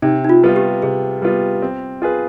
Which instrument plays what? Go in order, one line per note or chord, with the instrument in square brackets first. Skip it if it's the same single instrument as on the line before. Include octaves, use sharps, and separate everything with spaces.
[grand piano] C3 [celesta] D#4
[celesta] D#4
F4
[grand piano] G3 B3 F4
[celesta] G4
[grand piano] C3 [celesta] G#4
[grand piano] G3 B3 F4
C4
F4 G#4 B4